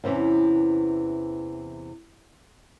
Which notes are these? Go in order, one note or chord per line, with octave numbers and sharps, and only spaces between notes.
E2 C3 E3 C#4